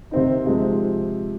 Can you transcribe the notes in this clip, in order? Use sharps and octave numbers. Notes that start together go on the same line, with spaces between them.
C3 D#3 C4 D#4
C3 F3 G#3 C4 G#4